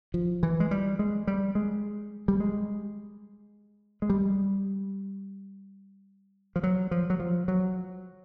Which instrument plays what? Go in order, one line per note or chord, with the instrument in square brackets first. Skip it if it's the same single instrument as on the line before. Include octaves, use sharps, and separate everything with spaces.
[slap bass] F3
E3
G#3
G3
G#3
G3
G#3
G3
G#3
G#3
G3
F3
F#3
F3
F#3
F3
F#3